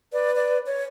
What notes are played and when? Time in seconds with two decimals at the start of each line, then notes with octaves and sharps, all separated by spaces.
0.13 B4 D5
0.36 D5
0.66 C#5